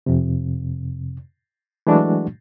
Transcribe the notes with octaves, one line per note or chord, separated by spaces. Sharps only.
F2 C3
E3 F#3 G#3 A3 D4 F#4